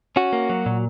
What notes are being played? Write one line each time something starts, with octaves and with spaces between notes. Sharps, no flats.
C#4 F#4
A#3
F#3
A#2